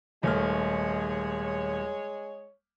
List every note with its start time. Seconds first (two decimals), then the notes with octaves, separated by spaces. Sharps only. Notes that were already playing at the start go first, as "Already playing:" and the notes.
0.23 D#1 G#3 A3 C#5 F6